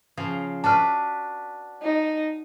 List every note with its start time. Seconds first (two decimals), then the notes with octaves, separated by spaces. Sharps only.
0.17 C#3 F3
0.64 D4 F#4 B4 A5 F6
1.83 D#4